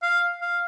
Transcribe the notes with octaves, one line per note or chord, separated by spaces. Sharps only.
F5
F5